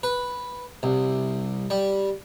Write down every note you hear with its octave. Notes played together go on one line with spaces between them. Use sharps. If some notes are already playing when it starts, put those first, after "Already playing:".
B4
C2
G3